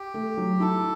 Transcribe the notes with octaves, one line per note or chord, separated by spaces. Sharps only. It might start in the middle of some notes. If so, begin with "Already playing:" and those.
Already playing: G4
A3
F#3
E4 A4